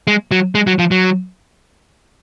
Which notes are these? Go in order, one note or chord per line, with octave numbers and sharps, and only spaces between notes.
G#3
F#3
G#3
F#3
F3
F#3